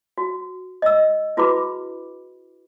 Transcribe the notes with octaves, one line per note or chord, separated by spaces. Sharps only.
F#4
D#5 E6
E4 F#4 G#4 B4 B5 D6